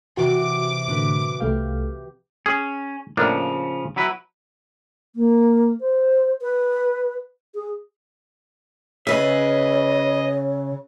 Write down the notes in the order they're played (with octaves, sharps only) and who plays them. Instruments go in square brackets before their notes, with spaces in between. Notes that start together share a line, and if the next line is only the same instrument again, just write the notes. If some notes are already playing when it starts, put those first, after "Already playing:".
[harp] C3 E3 [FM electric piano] F#4 [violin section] D6
[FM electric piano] A2 D3 [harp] F#4 B4
[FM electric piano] C2 A3 F5 [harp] G4
[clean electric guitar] C#4 [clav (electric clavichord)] G#4
[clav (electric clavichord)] A2 A#3 D4 [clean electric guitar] C#3 F3
[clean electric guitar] F#3 E4 B4
[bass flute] A#3
C5
B4
G#4
[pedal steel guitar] C#3 E5 [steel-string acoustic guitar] G#4 B4 [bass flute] C#5 [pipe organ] D#5